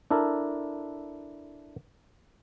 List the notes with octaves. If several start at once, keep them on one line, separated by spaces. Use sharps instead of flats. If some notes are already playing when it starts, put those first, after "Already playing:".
D4 E4 A4 A#4